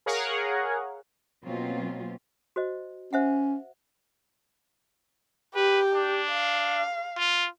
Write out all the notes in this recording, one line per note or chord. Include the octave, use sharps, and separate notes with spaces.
G#4 A#4 C#5 F5 F#5
B2 F#3 A#3 C4 C#4 F4
F#4 C5 D#5
C#4 C5 E5 F#5
G4 B4
D4
F5
F4